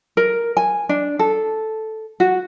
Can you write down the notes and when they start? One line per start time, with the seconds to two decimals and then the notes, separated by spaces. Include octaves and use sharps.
0.17 A#4
0.57 G#5
0.89 D4
1.19 A4
2.20 F#4